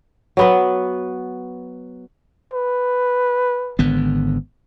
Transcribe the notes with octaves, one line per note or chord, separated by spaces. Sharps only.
F#3 B3 B4
B4
G#1 D3 B3